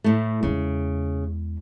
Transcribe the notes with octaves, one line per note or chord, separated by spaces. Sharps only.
A2 A3
E2 C#3 G#3